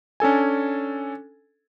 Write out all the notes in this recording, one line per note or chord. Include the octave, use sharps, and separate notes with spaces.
C#4 D4 A4 G#5